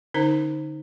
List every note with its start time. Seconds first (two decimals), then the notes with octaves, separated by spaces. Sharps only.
0.14 D3 C#4 D#4 A#4 C5